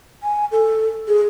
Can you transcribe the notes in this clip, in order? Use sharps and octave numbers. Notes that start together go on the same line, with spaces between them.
G#5
A4
G#4